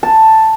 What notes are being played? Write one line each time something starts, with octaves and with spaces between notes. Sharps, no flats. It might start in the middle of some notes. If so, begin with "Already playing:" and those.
A5